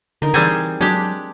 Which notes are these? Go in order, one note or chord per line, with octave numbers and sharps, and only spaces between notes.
D3 D#4 A#4
E3 G3 C4 G#4
F#3 G#3 D4 G4